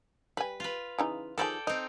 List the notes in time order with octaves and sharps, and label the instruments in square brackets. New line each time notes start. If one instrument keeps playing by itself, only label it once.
[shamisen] G3 G#5 [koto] B4
[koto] F4 B4
[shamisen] C#3 E3 D#4
[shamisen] D#3 F3 G#4 [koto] A4 D5 G5
[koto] C4 D#4 [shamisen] D#5